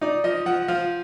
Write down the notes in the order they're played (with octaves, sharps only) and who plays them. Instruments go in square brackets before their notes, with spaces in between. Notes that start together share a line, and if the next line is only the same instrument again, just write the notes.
[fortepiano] D#4 [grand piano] D5
[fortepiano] F3 [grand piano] D#5
[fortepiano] F3 [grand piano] F#5
[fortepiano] F3 [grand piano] F5